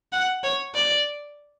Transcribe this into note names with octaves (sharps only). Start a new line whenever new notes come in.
F#5
C#5
D5